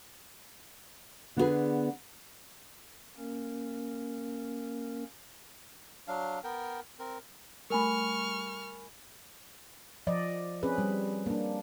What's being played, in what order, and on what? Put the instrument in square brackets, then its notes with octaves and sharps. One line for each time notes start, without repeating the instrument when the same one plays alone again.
[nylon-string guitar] D3 B3 D4 F#4 G#4 B4
[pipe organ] A#3 C#4 A#4
[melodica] F#3 D4 F5
B3 A#4 G5
C4 A#4
[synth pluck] G3 A3 [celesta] A#4 G#5 B5 [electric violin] C#6 F6
[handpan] F3 D5 D#5
C4 C#4 G#4 B4
G3
A#3 D4